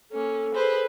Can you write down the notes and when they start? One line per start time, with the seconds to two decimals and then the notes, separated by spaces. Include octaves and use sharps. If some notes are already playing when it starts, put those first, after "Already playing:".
0.11 A#3 C#4 A4
0.54 G#4 B4 C5